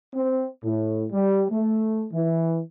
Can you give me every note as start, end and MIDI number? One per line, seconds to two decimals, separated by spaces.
0.15 0.49 60
0.64 1.06 45
1.13 1.44 55
1.52 2.08 57
2.13 2.61 52